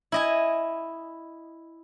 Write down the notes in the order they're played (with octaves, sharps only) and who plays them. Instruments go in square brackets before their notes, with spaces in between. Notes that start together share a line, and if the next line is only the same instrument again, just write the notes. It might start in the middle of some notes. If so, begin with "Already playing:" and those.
[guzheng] E4 D#5 G#5